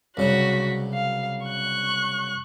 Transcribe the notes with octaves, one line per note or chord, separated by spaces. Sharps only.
C2 C#3 F#3 F#4 B6
F5
C#6 F#6